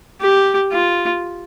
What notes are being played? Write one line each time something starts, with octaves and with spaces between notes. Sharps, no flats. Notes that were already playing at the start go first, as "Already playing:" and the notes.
G4
F4